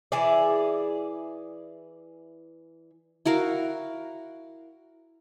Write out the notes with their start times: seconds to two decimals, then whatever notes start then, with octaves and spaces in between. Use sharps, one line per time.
0.12 E3 E4 G#4 D5
3.26 E4 F#4 A#4 F5